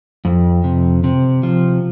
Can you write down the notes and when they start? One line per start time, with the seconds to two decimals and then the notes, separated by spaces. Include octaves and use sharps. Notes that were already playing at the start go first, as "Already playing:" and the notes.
0.25 F2
0.64 C3
1.04 C3
1.43 F3